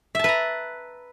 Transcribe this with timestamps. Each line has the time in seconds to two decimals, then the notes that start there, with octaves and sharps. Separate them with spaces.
0.15 E5
0.19 A5
0.24 B4
0.29 A#5